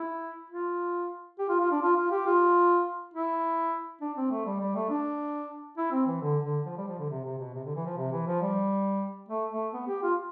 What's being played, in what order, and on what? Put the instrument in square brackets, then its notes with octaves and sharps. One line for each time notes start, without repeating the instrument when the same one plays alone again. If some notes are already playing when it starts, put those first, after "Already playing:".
Already playing: [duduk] E4
F4
G4
F4
F4
D4
F4
F4
G4
F4
E4
D4
C4
A3
G3
G3
A3
D4
E4
C4
E3
D3
D3
F3
G3
F3
D3
C3
C3
B2
C3
D3
E3
F3
C3
E3
F3
G3
A3
A3
B3
G4
F4